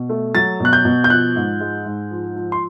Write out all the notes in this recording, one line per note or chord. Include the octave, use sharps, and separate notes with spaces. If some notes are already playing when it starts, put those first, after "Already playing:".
Already playing: B2
A3
F#3 A6
B2 F#6
G6
B2
G6
F3 F#6
G#2
G#3
G#2
F3
F3
C6